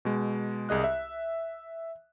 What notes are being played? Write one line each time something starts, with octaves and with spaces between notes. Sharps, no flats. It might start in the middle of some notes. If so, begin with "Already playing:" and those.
B2 G#3
C2 G#4 D#5 F#6
E5